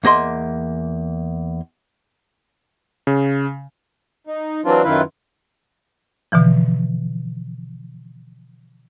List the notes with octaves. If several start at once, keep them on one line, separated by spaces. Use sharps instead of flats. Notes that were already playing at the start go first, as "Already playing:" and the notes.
E2 A#3 D#5 C6
C#3
D#4
E3 F#3 C4 D4 F4
F#2 D#3 E4 F4 B4
B2 D3 E3 F3